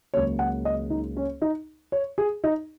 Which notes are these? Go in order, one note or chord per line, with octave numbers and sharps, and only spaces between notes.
C#2 C#3 F#3 A#3 C#5
F#5
D#5
D#4
C#4
D#4
C#5
G#4
D#4